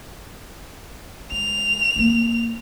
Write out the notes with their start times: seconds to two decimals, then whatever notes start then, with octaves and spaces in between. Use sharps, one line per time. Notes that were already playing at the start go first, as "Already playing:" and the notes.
1.32 G#3 F7
1.96 A#3 C4